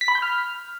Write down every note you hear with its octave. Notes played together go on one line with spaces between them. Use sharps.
B6
B5
G6
F6